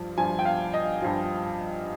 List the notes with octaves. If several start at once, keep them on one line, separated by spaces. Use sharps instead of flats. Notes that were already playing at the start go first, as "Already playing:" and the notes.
Already playing: G2 F3
G2 F3 G#5
G5
F5
D#5
G2 F3